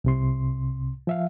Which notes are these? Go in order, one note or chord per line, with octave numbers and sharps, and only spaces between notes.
C2 C3 C6
F3 E5 F5